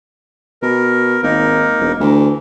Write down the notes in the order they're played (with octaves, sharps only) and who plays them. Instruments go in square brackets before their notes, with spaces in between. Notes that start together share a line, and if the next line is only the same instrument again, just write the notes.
[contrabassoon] B2 [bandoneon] A#4
[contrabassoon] G#1 [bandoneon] A#3 D#4 A#4
[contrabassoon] E1
[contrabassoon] D2 [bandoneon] E3